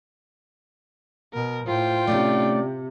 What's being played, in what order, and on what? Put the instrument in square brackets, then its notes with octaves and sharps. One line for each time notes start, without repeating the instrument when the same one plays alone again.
[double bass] B2 [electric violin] A#4
[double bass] A2 [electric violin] F4 G5 [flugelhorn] C5
[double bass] C3 [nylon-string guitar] A3 C#4 D#4 [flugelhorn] D5